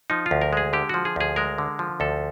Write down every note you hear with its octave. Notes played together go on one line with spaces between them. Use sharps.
F3 D#4
F4
D2
A#4
G#3 G#4
D3 G4
F3 F#4
G#4
D2 G#4
G#3 A#4
D3
F3
D2 A4